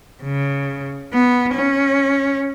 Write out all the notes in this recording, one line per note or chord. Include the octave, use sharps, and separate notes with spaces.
C#3
B3
C#4